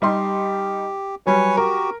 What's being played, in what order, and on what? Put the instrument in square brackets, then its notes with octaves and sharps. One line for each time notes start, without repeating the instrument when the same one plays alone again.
[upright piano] G3 D#4 C6 [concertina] G4
[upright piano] F#3 G3 [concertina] B4 C#5 G#5
[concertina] F#4 G4 [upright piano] A#4